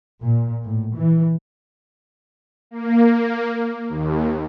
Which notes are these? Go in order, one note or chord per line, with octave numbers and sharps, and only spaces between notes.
A#2
A2
E3
A#3
D#2